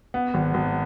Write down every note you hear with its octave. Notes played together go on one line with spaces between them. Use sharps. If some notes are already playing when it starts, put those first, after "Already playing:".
B3
G#1
G#1